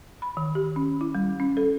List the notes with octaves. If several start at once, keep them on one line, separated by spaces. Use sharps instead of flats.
B5
D#3
G4
C#4
E4
G3
C#4
A4